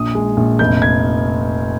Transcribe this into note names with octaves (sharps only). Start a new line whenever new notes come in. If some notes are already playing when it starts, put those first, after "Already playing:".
Already playing: A#1 D#6
G#3
A#1
F1 G6
G#6